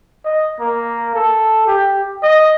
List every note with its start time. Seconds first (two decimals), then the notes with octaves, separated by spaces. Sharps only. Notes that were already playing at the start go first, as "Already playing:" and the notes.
0.25 D#5
0.60 A#3
1.15 A4
1.67 G4
2.23 D#5